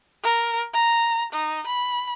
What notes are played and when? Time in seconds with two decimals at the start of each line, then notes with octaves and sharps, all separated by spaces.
0.23 A#4
0.73 A#5
1.32 D#4
1.66 B5